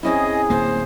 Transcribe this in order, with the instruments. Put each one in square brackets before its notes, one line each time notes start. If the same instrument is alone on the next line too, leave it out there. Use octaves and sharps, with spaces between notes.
[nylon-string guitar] C4 C#4 E4 [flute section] G#4 [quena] D#5
[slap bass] D1 A#3 [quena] C5